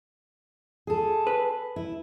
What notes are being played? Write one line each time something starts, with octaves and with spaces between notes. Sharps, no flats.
G#4 A4
B4
E4